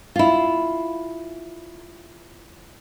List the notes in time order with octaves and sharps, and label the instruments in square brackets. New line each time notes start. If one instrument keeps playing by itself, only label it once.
[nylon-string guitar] E4 F4